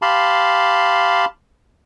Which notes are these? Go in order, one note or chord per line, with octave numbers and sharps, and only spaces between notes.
G4 F5 A5 B5 C6